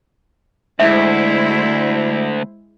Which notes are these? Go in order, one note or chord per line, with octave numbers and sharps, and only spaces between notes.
D2 G#3 E4 C5 E5